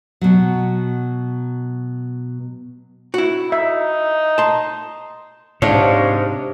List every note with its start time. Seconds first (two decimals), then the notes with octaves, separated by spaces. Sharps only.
0.21 B2 F#3
3.14 E4 F#4
3.52 D#4 E5
4.38 A5 C6
5.62 G#2 C3 D4 C#5 F5